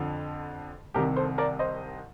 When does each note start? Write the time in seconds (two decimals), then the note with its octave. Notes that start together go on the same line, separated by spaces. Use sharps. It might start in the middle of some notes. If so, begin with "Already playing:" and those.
Already playing: F2 D3 F3
0.94 C2 C3 D#3 G4 A#4
1.16 A4 C5
1.38 A#4 D5
1.59 C5 D#5